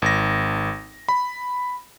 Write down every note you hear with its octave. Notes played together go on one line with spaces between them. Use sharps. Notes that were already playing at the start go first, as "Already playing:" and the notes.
G#1 A#6
B5